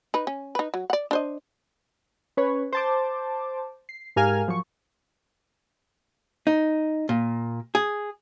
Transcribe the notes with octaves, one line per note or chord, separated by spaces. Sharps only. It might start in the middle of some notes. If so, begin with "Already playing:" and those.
D#4 B4
C#4
D#4 B4
F#3
D5 F#5
D4 C5 D#5
C#4 B4 C#5
C5 A5 D6
C7
G#2 G4 A#4 F5 G#5 F6
F3 F#3 C#6
D#4
A#2
G#4